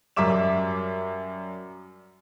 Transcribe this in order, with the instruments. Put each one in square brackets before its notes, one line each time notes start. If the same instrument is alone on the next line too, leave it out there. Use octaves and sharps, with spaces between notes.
[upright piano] F#2 G3 E5 D6 E7